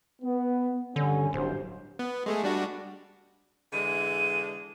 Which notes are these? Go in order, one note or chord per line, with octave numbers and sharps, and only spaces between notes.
B3
G2 D3 G3 C#4
D1 G2 F#3 C5
B3
G#3 A3 G#4
G3 D4 F#4
D3 E3 G#3 D#7